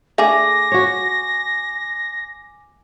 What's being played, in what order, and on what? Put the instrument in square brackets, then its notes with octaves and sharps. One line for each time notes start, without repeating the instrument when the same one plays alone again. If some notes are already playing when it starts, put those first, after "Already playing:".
[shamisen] A3 D4 G#4 [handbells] G#5 D6 [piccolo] A#6
[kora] F#4 C#5